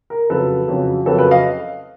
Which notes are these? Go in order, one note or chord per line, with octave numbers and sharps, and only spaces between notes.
A#4
F2 C#3 F#3 A4 B4
F2 C#3 F#3
F2 C#3 F#3 A4 B4
A4 B4
D#5 F5